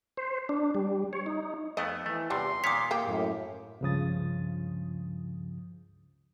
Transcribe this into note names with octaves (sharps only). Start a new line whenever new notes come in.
C5
D4
G3
C#5
D#4
F2 A3 B3 D#5
E3 A3
E2 C3 F3 G3 C6
A#2 D#3 C#5 D6 B6
A#3 G4
F#2 A2
C#2 G2 C#3 F3 D#6 A6